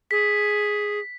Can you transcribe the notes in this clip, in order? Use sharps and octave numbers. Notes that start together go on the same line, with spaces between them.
G#4 B6